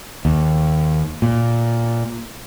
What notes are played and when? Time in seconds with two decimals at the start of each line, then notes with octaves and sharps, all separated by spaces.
0.25 D#2
1.22 A#2